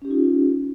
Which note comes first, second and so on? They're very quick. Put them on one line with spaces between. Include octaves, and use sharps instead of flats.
C#4 G4 D#4 F4